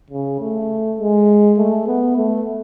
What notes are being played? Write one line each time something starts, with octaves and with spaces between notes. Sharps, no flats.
C#3
A3
G#3
A3
B3
A3